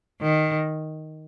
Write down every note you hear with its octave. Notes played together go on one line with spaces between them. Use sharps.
D#3